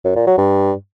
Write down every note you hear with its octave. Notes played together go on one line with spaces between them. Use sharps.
F#2
A#2
F#3
G2